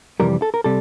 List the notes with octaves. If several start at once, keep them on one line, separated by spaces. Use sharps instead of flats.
F2 C3 E3 G3 A#4
A4
A#4
C3 G3 A4